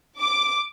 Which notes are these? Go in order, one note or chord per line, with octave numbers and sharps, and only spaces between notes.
D6